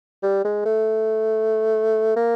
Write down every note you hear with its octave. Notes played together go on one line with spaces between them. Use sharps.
G3
G#3
A3
A#3